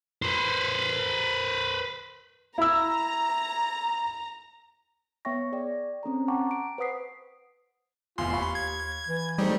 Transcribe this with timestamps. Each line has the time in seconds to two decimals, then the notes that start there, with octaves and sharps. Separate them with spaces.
0.22 B4 C5
2.58 E4 A#5 E6
5.25 B3 C#5 E5 G5 C#6 A#6
5.52 G#4 D5 G5
6.03 C4 C#4 A4 A#5
6.28 F#5 G5 A5 A#5 C#6 D6
6.51 D7
6.78 B4 C5 F#5 D#6 B6 C7
8.18 F1 E2 F4 C6
8.33 D#2 F5 B5 C#6
8.55 G#6
9.08 E3
9.38 G3 A3 C4 D#4